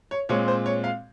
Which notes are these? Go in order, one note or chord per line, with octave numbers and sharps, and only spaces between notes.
C#5
A#2 G#3 C4 C#5
C5
C#5
F5